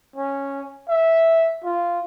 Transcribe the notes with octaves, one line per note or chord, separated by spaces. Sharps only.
C#4
E5
F4